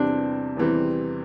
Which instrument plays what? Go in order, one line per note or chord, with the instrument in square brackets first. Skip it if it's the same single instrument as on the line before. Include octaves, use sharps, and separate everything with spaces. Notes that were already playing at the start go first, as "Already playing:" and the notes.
Already playing: [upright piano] E2 C3 E3 G3 C4 [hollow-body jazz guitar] D4
[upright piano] E2 C3 E3 G3 C4